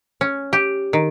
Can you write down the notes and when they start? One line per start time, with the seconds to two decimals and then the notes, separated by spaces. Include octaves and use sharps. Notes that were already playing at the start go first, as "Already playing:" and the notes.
0.21 C#4
0.53 G4
0.93 D#3